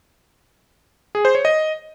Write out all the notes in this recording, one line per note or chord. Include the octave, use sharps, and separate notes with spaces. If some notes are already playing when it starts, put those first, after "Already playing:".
G#4
C5
C#5
D#5